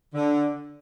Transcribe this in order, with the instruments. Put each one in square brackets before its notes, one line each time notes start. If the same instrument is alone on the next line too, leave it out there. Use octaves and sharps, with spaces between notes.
[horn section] D3